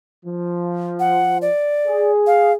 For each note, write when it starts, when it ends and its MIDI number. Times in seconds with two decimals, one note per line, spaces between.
0.25 1.48 53
0.99 1.38 78
1.42 2.11 74
1.87 2.55 68
2.27 2.52 77